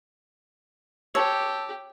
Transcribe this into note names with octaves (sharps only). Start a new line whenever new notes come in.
G4 C#5 A5 E6